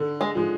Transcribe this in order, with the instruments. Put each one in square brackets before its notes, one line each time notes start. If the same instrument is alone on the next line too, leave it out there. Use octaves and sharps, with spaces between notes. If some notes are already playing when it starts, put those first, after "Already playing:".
Already playing: [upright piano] D3
[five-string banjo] G#3
[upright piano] F3 G#3